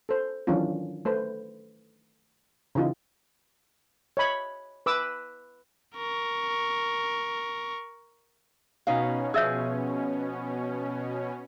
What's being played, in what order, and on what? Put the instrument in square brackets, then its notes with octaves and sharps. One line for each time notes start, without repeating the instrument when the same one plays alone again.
[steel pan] A4 C5
D#3 E3 F#3 C#4 D4 F4
A3 B4 C5
C#3 E3 D#4 F4 G4
C#5 D#5 B5
B4 D6 E6
[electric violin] A#4 C#6
[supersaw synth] B2 C#4 [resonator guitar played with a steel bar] D#4 B4 F5
[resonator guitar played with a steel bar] F3 G#4 [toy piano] C#5 E5 E6